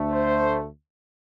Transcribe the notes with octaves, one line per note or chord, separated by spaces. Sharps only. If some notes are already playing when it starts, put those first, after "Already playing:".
Already playing: D2 D3 A3
C5